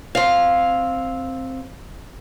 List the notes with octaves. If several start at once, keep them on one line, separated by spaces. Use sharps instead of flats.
C4 F5